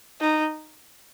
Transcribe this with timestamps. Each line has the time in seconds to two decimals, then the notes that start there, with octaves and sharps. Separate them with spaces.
0.21 D#4